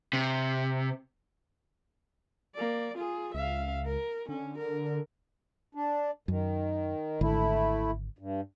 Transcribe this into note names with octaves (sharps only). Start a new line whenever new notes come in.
C3
A#3 D5
F4 G#4
C#2 E5 F5
A#4
D3 C#4
A#4
D4
F#2 D#3
G#1 D3 A3 E4
G2